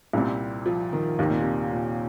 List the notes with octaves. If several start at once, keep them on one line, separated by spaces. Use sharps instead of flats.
C2 A#2 G3 C4
F3
D#3
D#2 C3 D#3 C4
A#2
C3
A#2